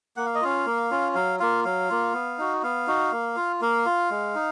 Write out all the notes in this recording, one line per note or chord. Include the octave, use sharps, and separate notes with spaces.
A#3 F#5
F5
D#5
C#4 F4 F5
A#3
C#4 F4
F#3 F5
A#3 F4 F5
F#3 F5
A#3 F4
B3
D#4 F#4
B3 F5
D#4 F#4
A#3
F4
A#3 F5
F4
G#3
D#4